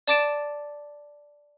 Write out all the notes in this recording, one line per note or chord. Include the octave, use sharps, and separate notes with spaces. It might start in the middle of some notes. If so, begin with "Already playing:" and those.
D5 A5 D6 A6 D7 E7